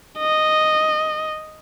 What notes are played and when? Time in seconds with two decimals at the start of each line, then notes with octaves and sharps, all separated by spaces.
0.19 D#5